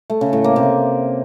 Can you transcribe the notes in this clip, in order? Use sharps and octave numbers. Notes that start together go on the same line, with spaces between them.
A3
C#3
A2
A#3
C3